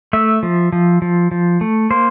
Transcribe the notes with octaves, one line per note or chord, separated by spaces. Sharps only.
A3 E5
F3
F3
F3
F3
A3
A#3 C5